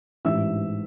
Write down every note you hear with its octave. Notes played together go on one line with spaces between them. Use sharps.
A1 G#2 E3 E5 E6